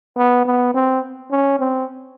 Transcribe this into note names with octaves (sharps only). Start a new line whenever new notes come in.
B3
B3
C4
C#4
C4